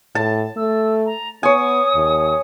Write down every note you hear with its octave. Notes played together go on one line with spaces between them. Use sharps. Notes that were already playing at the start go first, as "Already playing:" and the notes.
A2 A5
A3 E6
A#5
B3 C#5 G#5 D#6
D#2